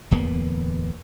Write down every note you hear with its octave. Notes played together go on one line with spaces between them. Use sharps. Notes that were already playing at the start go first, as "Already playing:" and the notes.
D1 E2 A#3 B3